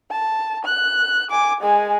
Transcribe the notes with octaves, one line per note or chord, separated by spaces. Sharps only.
A5
F#6
G#5 D6
G#3 G#5